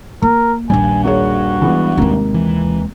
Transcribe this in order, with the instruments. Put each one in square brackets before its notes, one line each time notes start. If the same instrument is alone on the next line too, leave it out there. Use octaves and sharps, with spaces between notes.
[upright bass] A#3 [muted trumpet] A#4
[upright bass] A#1 D#2 [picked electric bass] G3 C4 D4 [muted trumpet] G#5
[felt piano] A#3 G#4 C#5 [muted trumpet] F#4
[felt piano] E3 G#3 B3
[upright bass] D#2 G#3 [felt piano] C3 A#3
[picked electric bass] E3